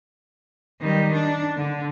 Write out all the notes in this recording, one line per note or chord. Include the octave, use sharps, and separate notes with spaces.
D#3 G3
D4
D3